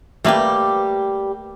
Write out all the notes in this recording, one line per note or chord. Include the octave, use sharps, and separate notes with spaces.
G3 A3 A#3 G4 B4